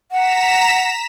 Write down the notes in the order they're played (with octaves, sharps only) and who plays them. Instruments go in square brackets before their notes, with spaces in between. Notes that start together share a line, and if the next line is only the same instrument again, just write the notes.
[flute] F#5 [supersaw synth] A#5 B6 E7